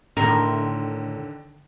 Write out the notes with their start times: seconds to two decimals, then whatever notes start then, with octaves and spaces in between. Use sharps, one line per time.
0.17 A2 D3 D#3 A#4 C6